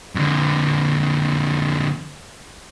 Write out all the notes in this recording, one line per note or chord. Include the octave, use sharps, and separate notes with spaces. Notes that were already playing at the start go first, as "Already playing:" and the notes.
F2 D3